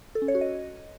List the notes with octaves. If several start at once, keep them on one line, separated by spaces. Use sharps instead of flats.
A4
C#4
C#5
F#4
D#5